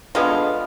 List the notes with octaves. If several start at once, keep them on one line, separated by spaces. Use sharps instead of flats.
D3 G#3 B3 F4